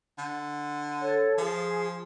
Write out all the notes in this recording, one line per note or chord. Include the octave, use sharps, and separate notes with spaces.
D3
A4 C#5
F3 G#4